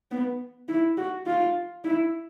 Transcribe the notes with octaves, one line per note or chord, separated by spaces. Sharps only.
B3
E4
F#4
F4
E4